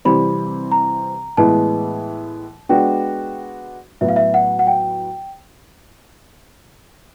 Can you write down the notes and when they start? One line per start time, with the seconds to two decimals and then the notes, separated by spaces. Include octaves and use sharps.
0.05 C3 E3 G3 C4 B5
0.72 A#5
1.37 A2 E3 G#3 B3 E4 A5
2.69 G#3 B3 D4 F#4 G5
4.01 A2 F#3 B3 E5
4.09 F5
4.16 E5
4.34 F#5
4.59 F#5
4.67 G5